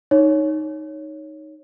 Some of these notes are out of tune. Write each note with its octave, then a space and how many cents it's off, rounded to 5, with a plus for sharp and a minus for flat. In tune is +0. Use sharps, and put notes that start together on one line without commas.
D#4 +0 C#5 +0